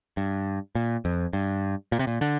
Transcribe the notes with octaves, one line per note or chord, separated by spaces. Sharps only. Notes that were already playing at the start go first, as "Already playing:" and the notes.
G2
A#2
F2
G2
A#2
C3
A#2
D3